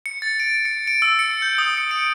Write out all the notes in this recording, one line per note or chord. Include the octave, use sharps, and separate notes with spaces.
C#7
A6
D7
C#7
D7
E6
C#7
G6
D#6
C#7
D7